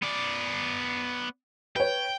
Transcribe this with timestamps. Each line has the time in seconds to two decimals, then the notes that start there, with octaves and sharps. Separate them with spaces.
0.03 B3 D5
1.76 B4 C#5 G5